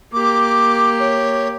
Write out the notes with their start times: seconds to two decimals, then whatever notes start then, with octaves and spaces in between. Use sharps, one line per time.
0.13 A#3 G4 D6
0.99 C#5